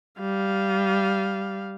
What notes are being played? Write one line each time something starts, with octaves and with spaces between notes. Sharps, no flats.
G3 F5